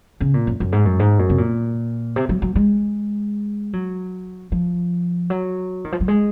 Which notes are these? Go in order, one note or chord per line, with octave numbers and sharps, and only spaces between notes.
C#3
A#2
F#2
F#2
G#2
F#2
G#2
F#2
C3
A#2
C3
F#3
F#3
G#3
F#3
F3
F#3
D#3
F3
F#3
G#3